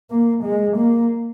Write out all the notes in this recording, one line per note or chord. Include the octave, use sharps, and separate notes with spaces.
A#3
G#3
A#3